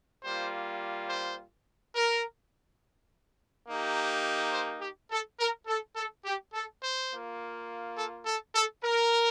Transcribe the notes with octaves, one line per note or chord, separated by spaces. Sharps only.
G3 A#3 F4 C5
C5
A#4
A#3 D#4 G4
C5
G4
A4
A#4
A4
A4
G4
A4
C5
A#3 F4
A4
A4
A4
A#4